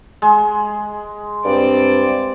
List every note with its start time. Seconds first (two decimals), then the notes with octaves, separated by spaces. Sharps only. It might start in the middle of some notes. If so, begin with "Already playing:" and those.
0.22 G#3
1.45 G2 C4 D5